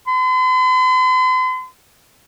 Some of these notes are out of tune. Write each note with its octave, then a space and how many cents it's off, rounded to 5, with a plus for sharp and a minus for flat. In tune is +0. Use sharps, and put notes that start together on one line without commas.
C6 -45